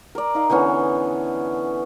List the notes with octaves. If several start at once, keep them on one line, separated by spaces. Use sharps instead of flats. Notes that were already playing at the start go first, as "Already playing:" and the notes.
A#4 D5
D#4 F5
D3 E3 B3 C#4